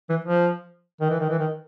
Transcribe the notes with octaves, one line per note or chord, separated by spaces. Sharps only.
E3
F3
D#3
E3
D#3
E3
D#3